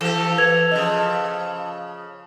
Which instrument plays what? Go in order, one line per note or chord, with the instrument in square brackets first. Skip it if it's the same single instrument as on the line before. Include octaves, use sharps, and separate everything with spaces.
[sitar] E3 G4 [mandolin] A4
[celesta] B4 G#6 F7
[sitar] C#3 F3 [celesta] D#5